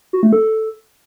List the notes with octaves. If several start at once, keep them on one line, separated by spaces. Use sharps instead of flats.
F#4
A3
A4